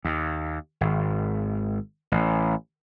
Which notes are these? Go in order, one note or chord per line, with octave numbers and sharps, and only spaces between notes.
D#2
G#1
A1